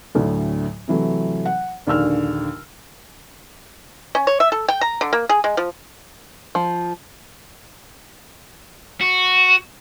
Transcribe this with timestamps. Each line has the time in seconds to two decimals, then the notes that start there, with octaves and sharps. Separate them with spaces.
0.15 D2 A2 D3 F#3
0.88 C3 E3 F#3 A3
1.45 F#5
1.87 A#1 D#2 D3 E6 F6
4.15 C#4
4.27 C#5
4.40 E5
4.52 A4
4.68 G5
4.81 A#5
5.01 D3
5.13 A#3
5.29 G#4
5.44 G#3
5.57 F3
6.55 F3
9.01 F#4